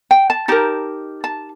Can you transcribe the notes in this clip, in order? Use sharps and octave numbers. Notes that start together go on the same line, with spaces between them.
G5
A5
D#4 G4 A#4 A5
A5